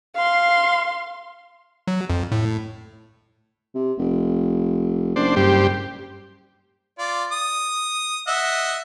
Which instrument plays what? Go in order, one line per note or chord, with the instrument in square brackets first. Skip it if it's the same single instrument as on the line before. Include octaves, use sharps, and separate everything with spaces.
[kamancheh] F5 C6
[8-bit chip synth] F#3
F2
A2
[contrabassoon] C3
F1
[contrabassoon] F#1 [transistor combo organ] D4 C5
[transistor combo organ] G2 G4 C5
[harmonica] F4 D5
D#6
D#5 E5 F#5